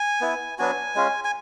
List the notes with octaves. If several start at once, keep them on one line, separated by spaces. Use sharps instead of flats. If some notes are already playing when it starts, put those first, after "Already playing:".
Already playing: G#5
B3 E4
F#3 B3 D4 F#4 G#5
G#3 C#4 F4
G#5